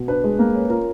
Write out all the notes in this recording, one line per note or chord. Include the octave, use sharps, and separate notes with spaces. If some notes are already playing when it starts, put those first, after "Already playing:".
Already playing: B2
D4 B4
G#3
A#3
C#4
F4 A#4